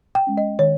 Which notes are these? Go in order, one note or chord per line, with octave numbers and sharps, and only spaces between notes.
G5
G#3 C#4
D#5
D#3 C#5